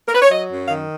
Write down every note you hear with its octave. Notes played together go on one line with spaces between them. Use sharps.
A#4
B4
C#5
F#3 D#5
F#2
D#3 F5